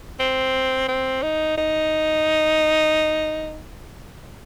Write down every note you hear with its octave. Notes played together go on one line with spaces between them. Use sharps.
C4
C4
D#4
D#4